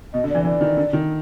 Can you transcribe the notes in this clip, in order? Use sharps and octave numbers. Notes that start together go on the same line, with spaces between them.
B2 D#5
D3
E3 D5
E3 D5
D#3
D3
D#3